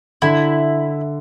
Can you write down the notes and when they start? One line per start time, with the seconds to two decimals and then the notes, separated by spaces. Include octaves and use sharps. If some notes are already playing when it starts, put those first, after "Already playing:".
0.22 D3 E4